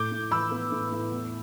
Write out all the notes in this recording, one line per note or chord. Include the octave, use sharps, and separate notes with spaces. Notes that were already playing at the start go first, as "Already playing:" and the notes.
Already playing: A2 D6 G6
A2
E3 B5 E6
B3
A2
A2
E2